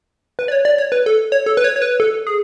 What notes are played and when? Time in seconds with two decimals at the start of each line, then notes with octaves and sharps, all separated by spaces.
0.39 B4
0.48 D5
0.52 C#5
0.65 D5
0.78 C#5
0.92 B4
1.06 A4
1.32 C#5
1.46 A4
1.57 B4
1.64 C#5
1.76 C#5
1.82 B4
2.00 A4
2.27 G#4